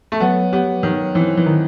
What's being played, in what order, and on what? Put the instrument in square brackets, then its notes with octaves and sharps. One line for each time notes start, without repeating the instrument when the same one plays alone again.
[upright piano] A3
[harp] F#3 [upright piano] B3
[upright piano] B3 [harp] G4
[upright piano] D#3 [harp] F#3
[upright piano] E3 [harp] C4
[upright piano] E3
[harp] D#3